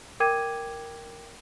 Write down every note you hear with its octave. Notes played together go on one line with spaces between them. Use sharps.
A#4 G5 D6 G#6 D#7